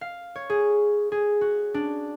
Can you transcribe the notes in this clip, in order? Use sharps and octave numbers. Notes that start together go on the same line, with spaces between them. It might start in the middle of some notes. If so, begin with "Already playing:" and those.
F5
C#5
G#4
G#4
F#4
D4